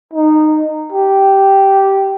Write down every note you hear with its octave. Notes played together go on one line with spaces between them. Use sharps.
D#4
G4